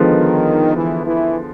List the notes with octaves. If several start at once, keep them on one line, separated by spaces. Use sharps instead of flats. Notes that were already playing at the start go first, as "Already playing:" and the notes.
Already playing: D3 D#3 F3 G#3 B3
E3
E3